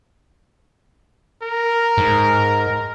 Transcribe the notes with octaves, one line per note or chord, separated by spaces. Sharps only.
A#4
G#2